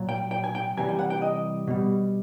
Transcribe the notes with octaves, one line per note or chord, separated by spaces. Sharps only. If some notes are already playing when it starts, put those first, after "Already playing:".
Already playing: A#2 F#3
G5
G5
G#5
G5
C3 E3 G3 G#5
G5
F#5
G5
D#5
B2 G3